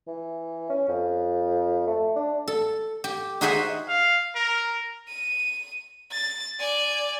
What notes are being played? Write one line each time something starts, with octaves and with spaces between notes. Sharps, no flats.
E3
C#4
F2
A3
D4
A4
G4
D#4 F#4 G#4 C5 E5 F#5
F5
A#4
D#7
A6
D5 G#5